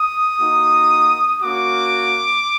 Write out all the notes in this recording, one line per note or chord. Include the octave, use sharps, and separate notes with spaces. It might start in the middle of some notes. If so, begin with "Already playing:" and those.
Already playing: D#6
A#3 D#4 F#4
A#3 C#4 F#4 D6